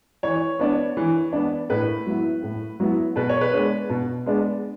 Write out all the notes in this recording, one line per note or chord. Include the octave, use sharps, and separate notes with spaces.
E3 C#5
B3 D4
E3
B3 D4
A2 B4
F#3 B3 E4
A2
F#3 B3 E4
B2 B4
C#5
B4
G#3 B3 D4
B2
G#3 B3 D4